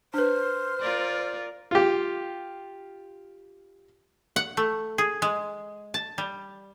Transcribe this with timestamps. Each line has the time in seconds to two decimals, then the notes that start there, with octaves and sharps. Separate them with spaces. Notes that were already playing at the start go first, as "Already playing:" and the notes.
0.14 D4 B4 C5 F6
0.80 F4 A#4 D5
1.71 F4 G4
4.36 F#5
4.57 A3
4.98 G#4
5.22 G#3
5.94 A5
6.18 G3